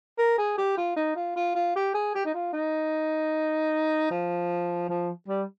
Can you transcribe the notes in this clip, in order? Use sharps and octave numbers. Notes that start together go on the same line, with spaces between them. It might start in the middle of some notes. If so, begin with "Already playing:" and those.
A#4
G#4
G4
F4
D#4
F4
F4
F4
G4
G#4
G4
D#4
F4
D#4
F3
F3
G3